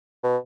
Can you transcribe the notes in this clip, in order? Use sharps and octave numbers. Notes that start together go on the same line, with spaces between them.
B2